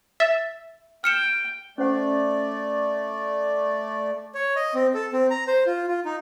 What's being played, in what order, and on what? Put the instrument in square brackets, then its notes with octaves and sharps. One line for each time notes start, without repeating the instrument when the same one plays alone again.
[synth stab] E5 [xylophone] A6
[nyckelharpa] G5 [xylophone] F6 C#7 E7
[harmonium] A3 D5 [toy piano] C#4 C5 F#5
[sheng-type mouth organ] C#5
D#5
C4
A4
C4
A#5
C5
F4
F4
D#4